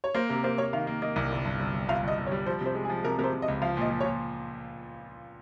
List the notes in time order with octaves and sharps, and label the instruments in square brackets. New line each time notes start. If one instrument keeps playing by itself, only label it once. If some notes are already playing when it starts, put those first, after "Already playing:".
[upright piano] C#5
[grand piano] A#3 [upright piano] C5
[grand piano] C3 [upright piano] A#4
[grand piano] A#3 [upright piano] C5
[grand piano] A#3 [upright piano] C#5
[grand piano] D#3 [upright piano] F5
[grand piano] A#3
[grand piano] A#3 [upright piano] D#5
[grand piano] C2
G1
G2
G1
G1
[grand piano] G1 [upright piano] F5
[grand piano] G1
[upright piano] D#5
[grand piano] G1
[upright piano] C#5
[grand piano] G3
[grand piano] F3 [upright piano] C5
[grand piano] C3 [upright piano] C5
[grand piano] G#3
[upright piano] G#4
[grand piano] F3
[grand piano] C3 [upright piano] A#4
[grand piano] C3 [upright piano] A#4
[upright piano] C5
[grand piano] C3
[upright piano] D#5
[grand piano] C#2
[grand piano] F3 [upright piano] F5
[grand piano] A#2 [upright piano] D#5
[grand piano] F3
[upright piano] C#5
[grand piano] A#2